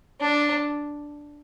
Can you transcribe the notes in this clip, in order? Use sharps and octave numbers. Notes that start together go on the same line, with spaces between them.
D4